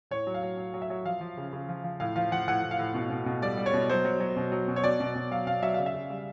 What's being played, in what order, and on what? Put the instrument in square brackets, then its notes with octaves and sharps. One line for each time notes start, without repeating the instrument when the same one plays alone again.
[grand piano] A2 C#5
F#3
F5
F#3
F#3
F#3
E5
F#3
F3 F5
F3
C#3
C#3
F3
F3
A2 F5
F3 F5
F3 F#5
A2 F#5
A2
F5
A2
B2
B2
B2
G3 D5
G3
C#5
B2
F#3 C5
F#3
F#3
B2
F#3
B2
C#5
B2 D5
B2
B2
F#3 F5
B2 F5
F#3 E5
C#3 F5
E5
C#3
G3